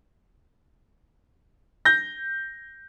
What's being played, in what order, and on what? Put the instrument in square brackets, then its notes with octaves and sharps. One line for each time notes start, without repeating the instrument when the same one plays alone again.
[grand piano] G6 A#6